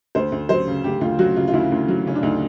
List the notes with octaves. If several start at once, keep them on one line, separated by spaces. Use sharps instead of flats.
D2 C5
D2
F#3 C5
C#3
D2 G4
D2 F4
F#3 F#4
C#3 F4
F4
D2 E4
D2
F#3
C#3 C#4
D4
D2 D#4